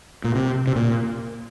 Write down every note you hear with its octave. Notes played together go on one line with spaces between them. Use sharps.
A#2
C3
C3
A#2